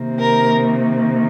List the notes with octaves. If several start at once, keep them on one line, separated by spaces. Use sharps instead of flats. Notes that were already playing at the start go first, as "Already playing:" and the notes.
Already playing: C3 D#3 A#3
A#4